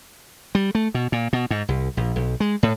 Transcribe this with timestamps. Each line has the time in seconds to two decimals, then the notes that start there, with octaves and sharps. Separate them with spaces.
0.55 G3
0.75 A3
0.94 B2
1.12 A#2
1.33 B2
1.51 G#2
1.68 C2
1.97 A#1
2.16 B1
2.40 G#3
2.63 A2